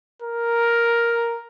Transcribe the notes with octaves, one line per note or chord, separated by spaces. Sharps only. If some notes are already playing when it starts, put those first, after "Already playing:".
A#4